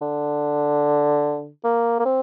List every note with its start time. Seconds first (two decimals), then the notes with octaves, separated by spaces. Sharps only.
0.02 D3
1.64 A#3
1.99 A#3
2.05 C4